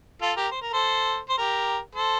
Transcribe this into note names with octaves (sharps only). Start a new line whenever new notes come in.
F4 A4
G4 A#4
C5
A#4
A4 C5
C5
G4 A#4
A4 C5